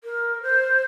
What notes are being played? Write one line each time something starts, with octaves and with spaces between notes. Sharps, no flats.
A#4
C5